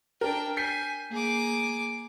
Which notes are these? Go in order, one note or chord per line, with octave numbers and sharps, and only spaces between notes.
D4 A#4 G5
G#5 G6 B6 C7
A#3 G#4 D6